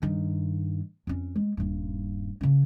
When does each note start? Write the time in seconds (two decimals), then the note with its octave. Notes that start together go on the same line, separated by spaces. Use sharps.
0.02 G2 D#3
1.07 F2 C#4
1.35 G#3
1.57 D#1 G2
2.41 C#3 C#4